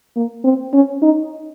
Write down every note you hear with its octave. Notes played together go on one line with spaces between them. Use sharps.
A#3
C4
C#4
D#4